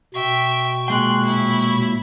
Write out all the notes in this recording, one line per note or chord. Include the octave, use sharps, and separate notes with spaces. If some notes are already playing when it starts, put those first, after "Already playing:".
B2 E5 G5 C#6
A#2 G#3 G5 C6 F#6
E4